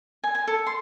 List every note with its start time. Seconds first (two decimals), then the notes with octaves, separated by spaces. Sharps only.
0.24 G#5
0.35 G#5
0.47 A4
0.67 C6